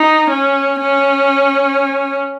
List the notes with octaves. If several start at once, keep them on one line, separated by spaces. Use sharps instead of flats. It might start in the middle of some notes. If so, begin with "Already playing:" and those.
Already playing: D#4
C#4
C#4